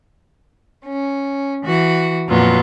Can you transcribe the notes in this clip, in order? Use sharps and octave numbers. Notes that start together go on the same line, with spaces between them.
C#4
E3 F#4
F2 A#2 F#3 B3 F4